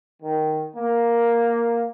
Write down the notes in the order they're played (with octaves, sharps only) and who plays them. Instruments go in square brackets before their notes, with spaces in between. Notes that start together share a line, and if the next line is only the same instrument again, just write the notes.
[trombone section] D#3
A#3